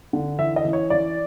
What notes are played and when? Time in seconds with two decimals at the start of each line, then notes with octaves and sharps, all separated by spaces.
0.13 D3
0.39 E3 E5
0.56 D#5
0.65 E3
0.73 C#5
0.90 E3 D5